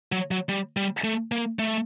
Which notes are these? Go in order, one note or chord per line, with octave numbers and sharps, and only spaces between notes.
F#3
F#3
G3
G3
A3
A#3
A3